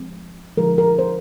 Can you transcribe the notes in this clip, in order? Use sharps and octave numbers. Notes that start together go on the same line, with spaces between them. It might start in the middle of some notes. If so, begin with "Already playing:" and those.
Already playing: F3 G#3 C4
D3 F3 G#3 A#4
A#4
C5